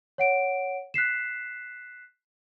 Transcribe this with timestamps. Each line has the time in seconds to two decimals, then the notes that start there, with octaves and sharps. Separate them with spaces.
0.18 C#5 F#5 D7
0.94 F#6 B6 C7 E7